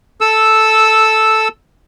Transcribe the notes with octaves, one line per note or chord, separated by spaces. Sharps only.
A4 E6